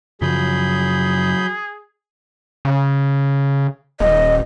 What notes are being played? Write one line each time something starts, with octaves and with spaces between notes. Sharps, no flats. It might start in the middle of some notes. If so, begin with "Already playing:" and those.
F#2 C#3 F3 F#3 G#4 B5 G6
C#3
D#1 D#5